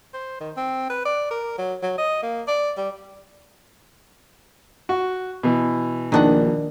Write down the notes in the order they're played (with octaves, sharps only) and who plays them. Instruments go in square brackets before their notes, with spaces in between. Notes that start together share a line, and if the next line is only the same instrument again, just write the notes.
[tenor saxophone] C5
D#3
C4
B4
D5
A#4
F#3
F#3
D#5
A#3
D5
G3
[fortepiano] F#4
B2 E3
[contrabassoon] A#1 [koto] D#3 D4 F#5